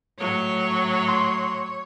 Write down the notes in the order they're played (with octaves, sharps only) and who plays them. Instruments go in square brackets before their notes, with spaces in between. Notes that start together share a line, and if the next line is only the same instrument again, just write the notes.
[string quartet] A2 F#3 [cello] C#5
[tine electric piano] C6